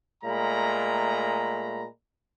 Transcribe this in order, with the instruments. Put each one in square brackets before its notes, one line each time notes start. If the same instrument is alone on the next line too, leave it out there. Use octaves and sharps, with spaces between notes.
[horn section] A#2 G#3 A3 A#5 B5